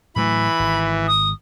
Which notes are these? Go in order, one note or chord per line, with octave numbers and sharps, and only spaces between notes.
A2 E3 F#3 A3 B5
G#1
D#6